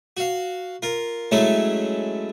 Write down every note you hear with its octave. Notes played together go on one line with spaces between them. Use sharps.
F#4 F5
F4 A#4
F#3 G#3 A3 C#4 E4